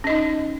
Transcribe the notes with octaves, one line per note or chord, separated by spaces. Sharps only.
C#4 D#4 D#5